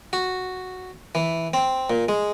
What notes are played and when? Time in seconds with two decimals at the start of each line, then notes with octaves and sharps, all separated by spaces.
0.13 F#4
1.15 E3
1.54 C4
1.90 A#2
2.09 G#3